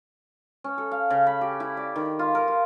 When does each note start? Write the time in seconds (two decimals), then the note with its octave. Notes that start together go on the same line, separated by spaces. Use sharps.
0.64 C#4
0.78 A4
0.92 F5
1.10 C#3
1.27 B5
1.41 G4
1.60 E4
1.77 D5
1.96 D#3
2.19 F4
2.35 A#4
2.48 F4